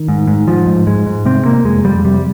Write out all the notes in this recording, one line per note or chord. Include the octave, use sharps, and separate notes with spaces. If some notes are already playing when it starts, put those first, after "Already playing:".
Already playing: D#3
G#2
G#2
G#2 F3
G#2
G#2 G#3
G#2
C3 C4
C3 A#3
F2 G#3
F2 G3
C3 G3